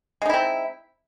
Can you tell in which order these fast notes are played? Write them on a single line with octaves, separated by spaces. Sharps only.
G#3 D#4 E4 C4